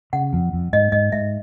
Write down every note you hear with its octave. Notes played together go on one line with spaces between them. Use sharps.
C#3 F#5
F2
F2
G#2 D#5
G#2 D#5
G#2 E5